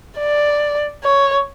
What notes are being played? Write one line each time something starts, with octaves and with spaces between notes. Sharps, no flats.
D5
C#5